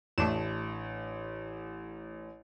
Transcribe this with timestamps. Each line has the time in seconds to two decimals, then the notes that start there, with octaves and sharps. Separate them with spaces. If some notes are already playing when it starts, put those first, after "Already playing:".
0.18 A1 A3 D4 E7